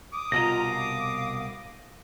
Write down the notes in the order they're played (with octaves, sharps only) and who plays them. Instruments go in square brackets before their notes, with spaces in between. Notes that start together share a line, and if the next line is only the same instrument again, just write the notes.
[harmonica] D6 D#6
[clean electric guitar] C2 B2 D#5 [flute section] F4 A#5 [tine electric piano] A#6
[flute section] F5